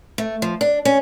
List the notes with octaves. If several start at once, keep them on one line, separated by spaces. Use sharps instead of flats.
A3
F3
D4
C#4